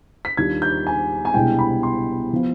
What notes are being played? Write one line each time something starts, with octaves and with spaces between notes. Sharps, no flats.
B6
D#2 D#3 G3 D4 F4 G#6
G6
G#5
G#5
C2 B2 G#3 D4 G5
B5
C6
F3 B3 F4